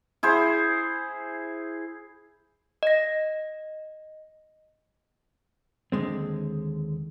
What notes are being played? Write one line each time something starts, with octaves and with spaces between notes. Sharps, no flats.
E4 G#4 C5
D#5 A#6
D#2 D3 G#3 C4